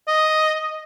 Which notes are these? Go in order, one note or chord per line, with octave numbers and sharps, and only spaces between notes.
D#5